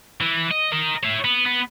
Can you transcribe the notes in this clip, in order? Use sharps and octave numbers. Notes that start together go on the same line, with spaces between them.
E3
D#5
A#4 D#5
E4 C#5
B3
B3